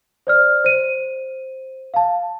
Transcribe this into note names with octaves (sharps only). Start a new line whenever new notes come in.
C5 D5 F6
C5 D#7
F5 A5